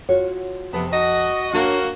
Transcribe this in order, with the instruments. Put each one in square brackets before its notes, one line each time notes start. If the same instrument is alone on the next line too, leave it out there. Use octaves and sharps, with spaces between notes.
[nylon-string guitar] F4 F#4 C#5
[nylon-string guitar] F2 A5 [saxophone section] C3 B3
[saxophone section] F#4 D#5
[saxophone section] A#3 F#4 [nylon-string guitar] D4 C#5